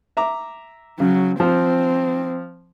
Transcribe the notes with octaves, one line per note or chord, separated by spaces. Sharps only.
E5 A#5 D6
C#3 F#3
F3 C4